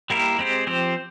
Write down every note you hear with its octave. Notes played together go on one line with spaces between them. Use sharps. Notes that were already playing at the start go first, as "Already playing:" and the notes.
G3 A#3 E4 G4 A#4
G#3 C4 G4 C5
F3 C4 G4 C5